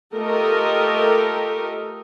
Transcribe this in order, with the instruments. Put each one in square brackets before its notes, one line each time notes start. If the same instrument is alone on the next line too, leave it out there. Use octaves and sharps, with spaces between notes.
[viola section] A3 F4 G4 A4 A#4 D#5